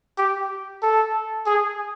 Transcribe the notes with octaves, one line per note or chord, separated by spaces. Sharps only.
G4
A4
G#4